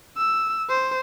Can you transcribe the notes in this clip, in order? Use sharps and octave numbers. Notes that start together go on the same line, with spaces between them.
E6
C5